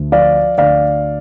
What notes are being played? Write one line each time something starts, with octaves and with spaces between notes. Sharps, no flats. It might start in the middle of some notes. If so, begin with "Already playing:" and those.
Already playing: D2
F3 D5 F5
D2 D5 F5